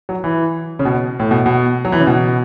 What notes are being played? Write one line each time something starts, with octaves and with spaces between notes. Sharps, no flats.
F#3
E3
C#3
B2
A2
B2
B2
F#3
E3
C#3
B2